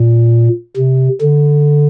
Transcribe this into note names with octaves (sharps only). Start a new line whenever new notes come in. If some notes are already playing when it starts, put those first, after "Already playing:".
Already playing: A#2
C3
D3